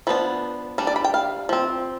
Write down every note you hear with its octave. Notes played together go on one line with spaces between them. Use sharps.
F3 B3 D4 B4
G3 D4
D5
B5
G5
F5
F3 C4